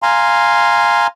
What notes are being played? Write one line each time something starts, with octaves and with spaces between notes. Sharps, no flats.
F5 G#5 A#5 C6